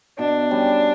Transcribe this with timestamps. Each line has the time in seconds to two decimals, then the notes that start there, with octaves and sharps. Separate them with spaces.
0.19 B2 D4
0.51 G3 C#4